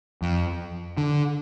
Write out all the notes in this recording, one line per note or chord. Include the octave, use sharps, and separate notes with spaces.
F2
D3